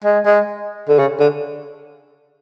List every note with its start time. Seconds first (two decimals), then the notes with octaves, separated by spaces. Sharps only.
0.04 G#3
0.25 G#3
0.89 D3
0.99 C#3
1.20 D3